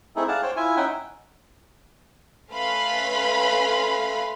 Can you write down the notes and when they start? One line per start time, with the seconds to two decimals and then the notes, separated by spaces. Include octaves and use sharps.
0.16 A3 C4 D#4 E4 G#4 A4
0.28 G#4 D5 F5 F#5 A5
0.42 C5 C#5 G5
0.56 E4 F4 E5 G#5
0.77 C#4 D#4 E5 F#5 G5
2.52 A3 C#4 B4 F5 B5 C6